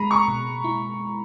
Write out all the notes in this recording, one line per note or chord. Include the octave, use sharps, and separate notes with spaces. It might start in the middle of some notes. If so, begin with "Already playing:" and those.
Already playing: G#3 A#5 B5
C#6
B2
E4